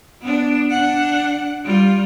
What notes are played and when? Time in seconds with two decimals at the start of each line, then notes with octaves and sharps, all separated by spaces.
0.21 B3 D4
0.71 D4 F#5
1.64 G3 F4